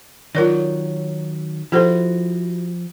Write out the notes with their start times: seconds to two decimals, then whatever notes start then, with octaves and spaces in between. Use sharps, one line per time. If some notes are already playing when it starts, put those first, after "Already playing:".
0.35 D#3 F#3 F4 A#4 C#5 D5
1.72 F3 E4 F#4 G4 A4 C5 C6